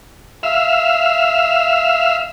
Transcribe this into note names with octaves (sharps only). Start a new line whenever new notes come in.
E5 F5